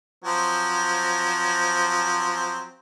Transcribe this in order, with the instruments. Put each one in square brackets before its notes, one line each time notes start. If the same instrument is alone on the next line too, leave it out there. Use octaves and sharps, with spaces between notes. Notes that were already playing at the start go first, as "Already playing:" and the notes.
[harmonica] F3 F#3 C4